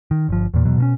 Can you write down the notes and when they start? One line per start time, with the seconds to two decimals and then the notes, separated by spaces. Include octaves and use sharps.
0.11 D#3
0.29 G1 F3
0.54 E2 A#2
0.65 E2 B2 F#3
0.78 B2 A#3 C#4